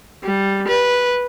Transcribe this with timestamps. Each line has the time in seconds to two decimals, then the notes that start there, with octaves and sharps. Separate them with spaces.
0.23 G3
0.68 B4